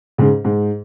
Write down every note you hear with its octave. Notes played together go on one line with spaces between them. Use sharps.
G#2 C#3
G#2